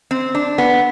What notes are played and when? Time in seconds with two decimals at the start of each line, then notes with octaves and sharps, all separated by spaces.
0.11 C4
0.35 D4
0.58 B3